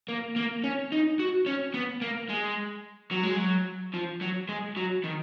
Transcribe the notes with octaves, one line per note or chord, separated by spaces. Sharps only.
A#3
A#3
C#4
D#4
F#4
C#4
B3
A#3
G#3
F#3
G#3
F#3
F3
F#3
G#3
F#3
D#3